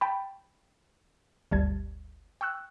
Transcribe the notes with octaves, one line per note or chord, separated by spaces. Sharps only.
G5 A5 B5
G1 D2 G3 A5 G#6
G5 C#6 E6 F#6